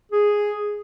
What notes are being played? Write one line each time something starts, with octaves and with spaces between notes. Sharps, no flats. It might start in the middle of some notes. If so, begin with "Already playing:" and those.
G#4